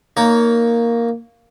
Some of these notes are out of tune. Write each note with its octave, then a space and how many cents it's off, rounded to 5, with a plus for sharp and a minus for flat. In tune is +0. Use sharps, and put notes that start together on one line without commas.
A#3 +0 D#4 +0 C#5 +25